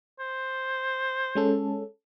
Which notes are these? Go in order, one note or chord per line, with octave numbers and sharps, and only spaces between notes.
C5
G#3 C#4 A4